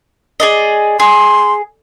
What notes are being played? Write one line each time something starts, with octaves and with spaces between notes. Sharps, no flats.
G#4 D5 D#5
G#4 C6